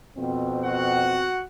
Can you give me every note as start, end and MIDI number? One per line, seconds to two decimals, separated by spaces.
0.18 1.31 41
0.18 1.31 47
0.18 1.31 60
0.64 1.44 66
0.64 1.44 78